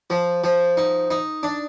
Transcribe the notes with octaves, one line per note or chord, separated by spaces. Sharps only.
F3
F3
D#4
D#4
D4